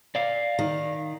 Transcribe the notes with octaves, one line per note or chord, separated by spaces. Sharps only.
D5 F5
D#3